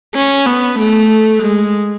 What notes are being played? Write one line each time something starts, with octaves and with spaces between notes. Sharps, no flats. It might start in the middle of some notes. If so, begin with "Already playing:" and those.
C#4
B3
A3
G#3